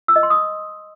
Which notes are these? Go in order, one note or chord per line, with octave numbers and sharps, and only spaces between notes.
E6
D#5
C6
D#6